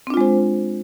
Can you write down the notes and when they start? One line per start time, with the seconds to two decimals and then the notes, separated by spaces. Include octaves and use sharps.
0.07 C4
0.10 D4
0.14 F4
0.17 G#3
0.21 C5